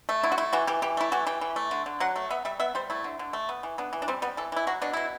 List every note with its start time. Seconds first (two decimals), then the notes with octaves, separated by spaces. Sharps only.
0.09 A3
0.23 D3 E4
0.32 F#4
0.38 A3 E4
0.53 E3 F#4
0.67 E3 G4
0.82 E3 G4
0.97 A3 E4
1.12 E3 F#4
1.27 E3 G4
1.41 E3
1.56 A3
1.71 D3
1.86 D3
2.00 F#3 F#5
2.16 A3
2.30 B3 E5
2.45 G3 E5
2.60 B3 E5
2.75 G3 C5
2.90 A3 E4
3.04 D3
3.19 D3
3.33 A3
3.49 B3
3.63 E3
3.78 B3 D4
3.93 E3
4.02 D4
4.08 G3 C4
4.22 G3 B3
4.37 E3 A4
4.52 E3 E4
4.67 F#3 F#4
4.82 B2 D4
4.93 B2 E4